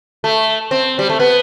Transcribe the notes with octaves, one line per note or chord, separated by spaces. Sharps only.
A3
C4
G3
A3
B3